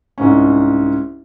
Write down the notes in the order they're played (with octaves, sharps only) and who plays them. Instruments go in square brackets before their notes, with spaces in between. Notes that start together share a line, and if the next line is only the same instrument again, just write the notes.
[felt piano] C2 G#2 C#4